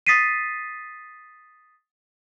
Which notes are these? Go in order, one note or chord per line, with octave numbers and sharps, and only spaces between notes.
D#6 A6 B6 C7 D#7